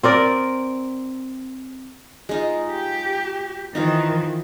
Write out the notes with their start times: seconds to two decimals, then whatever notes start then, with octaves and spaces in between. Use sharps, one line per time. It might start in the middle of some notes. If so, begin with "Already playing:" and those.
0.03 C4 A#4 D5
2.29 G#3 D#4 F4
2.71 G4
3.75 D#3 E3 D#4 F4 C5